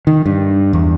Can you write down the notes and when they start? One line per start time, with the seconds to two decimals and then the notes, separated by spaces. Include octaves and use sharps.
0.07 D#3
0.26 G2
0.73 E2